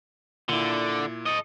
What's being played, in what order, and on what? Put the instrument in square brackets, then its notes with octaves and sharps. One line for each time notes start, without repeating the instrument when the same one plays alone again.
[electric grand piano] A#2 E4 [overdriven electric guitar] D3
[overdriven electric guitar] A4 D#5